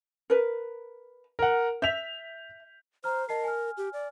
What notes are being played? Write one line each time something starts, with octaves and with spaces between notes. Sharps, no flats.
A#4 B4
A#4 F#5
E5 G6 B6 F7
C5 A#5 F6
A#4 D#5 A5 C7
G#5 F6
G4
D5